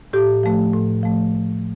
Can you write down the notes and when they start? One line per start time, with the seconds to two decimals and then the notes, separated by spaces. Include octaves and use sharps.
0.13 A2 G4
0.43 F3 A3
0.73 A2
1.03 F3 A3